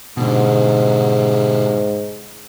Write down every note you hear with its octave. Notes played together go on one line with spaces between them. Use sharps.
G#2 B2 D3